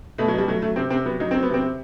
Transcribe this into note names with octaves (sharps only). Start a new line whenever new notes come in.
B2 A3
F#3
B2 G3
F#3 A3
F#3 A3
C3 C4
C3 C4
F#3 B3
F#3 D#4
F#3 C4
B3
C3
C4
C3